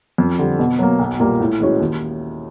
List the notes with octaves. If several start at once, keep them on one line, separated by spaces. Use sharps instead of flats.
F2
D3 G3
B2
F#3 A#3
B1
A#2 G3 A#3
A2
E3 G#3 C#4 F#4
D#2